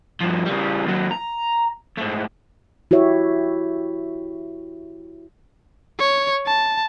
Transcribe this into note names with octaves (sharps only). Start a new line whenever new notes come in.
G2 F3
C#3 G3
D#2 F#3
A#5
G#2 A3
E4 F#4 G4 C#5 E5
C#5
A5